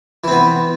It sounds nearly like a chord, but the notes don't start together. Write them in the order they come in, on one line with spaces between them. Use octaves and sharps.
E3 C4 B3